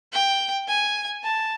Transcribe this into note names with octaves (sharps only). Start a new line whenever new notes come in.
G5
G#5
A5